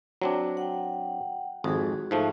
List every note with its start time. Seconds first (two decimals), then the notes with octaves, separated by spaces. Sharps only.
0.22 F#3 C4 D4
0.57 F#5 G5
1.64 G#1 F2 F#4 G#4
2.11 G#2 F3 A3